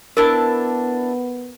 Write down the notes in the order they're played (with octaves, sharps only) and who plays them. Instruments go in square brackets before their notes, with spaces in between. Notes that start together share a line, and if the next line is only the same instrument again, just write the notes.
[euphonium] B3 [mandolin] D4 E4 A5 [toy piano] A#4